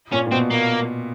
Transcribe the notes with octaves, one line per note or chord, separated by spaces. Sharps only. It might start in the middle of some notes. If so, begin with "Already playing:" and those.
A#2 C#4
A#2
B2 C4
A#3